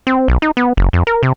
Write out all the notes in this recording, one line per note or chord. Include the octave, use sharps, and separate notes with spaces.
C4
B1
D#4
B3
F#1
F2
A#4
C3